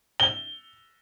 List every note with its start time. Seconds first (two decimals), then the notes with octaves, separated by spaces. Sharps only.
0.20 G7